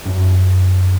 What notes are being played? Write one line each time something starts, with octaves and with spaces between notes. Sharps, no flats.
F#2